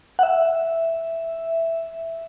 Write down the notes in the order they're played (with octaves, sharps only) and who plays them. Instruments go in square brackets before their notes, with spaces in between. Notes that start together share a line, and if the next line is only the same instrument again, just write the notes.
[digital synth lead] F#5
E5